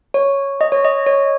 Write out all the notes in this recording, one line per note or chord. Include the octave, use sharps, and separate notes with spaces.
C#5
D#5
C#5
D#5
C#5